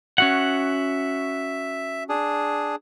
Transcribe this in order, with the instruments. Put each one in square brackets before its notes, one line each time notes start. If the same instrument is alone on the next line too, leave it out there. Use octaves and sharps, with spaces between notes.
[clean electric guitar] C#4 F#4 F#5 [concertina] E5
[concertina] D4 G#4